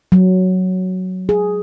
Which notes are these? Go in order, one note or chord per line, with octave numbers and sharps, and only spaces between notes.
F#3
G#4